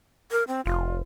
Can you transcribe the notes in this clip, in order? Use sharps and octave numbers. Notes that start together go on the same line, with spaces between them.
A#4
C4
F1 F4